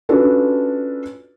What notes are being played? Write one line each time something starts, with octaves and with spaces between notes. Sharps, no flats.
C#4 D4 F4 F#4 A4 B4